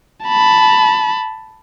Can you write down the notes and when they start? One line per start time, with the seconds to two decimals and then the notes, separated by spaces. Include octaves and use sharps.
0.25 A5 B5